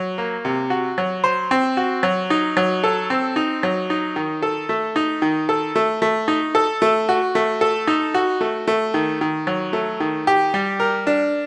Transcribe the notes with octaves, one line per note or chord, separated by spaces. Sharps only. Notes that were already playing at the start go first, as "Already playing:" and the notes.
Already playing: F#3
A#3
C3
F#4
F#3
C5
C4
F#4
F#3
D#4
F#3
A4
C4
D#4
F#3
D#4
D#3
A4
A3
D#4
D#3
A4
A3
A3
D#4
A4
A3
F#4
A3
A4
D#4
F#4
A3
A3
D#3
D#3
F#3
A3
D#3
G4
G3
A#4
D4